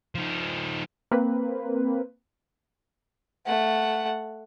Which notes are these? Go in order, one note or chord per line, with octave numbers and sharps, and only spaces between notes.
F3 D#4
A#3 C4 B4
A3 F#5